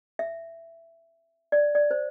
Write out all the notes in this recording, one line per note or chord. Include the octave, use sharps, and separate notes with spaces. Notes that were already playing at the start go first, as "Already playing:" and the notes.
E5
D5
D5
C5